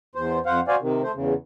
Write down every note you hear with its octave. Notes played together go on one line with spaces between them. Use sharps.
E2 C5
F2 C5 F5 F#5
F#4 C5 D5 F5 G#5
C3 D#3
A3 C5
E2 C#3